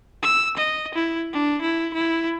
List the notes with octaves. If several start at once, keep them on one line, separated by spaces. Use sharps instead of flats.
E6
D#5
E4
D4
E4
E4